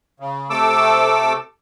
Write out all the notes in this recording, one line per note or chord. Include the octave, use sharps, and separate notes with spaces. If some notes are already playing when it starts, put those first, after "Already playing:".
C#3
C3 A3 A4 D6 E6